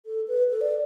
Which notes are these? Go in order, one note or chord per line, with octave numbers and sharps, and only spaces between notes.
A4
B4
A4
D5